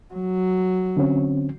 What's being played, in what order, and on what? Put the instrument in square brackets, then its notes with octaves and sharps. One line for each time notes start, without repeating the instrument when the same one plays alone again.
[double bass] F#3
[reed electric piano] D3 C4 C#4